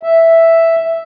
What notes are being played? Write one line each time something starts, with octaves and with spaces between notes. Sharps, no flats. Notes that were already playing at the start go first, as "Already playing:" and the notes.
E5